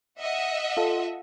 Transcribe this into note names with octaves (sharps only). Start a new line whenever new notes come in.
D#5 E5 F#5
F4 A4